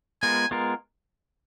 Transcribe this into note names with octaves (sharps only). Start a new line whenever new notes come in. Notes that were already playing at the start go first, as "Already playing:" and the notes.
G#3 B3 F4 A#4 G#5
G#3 B3 F4 A#4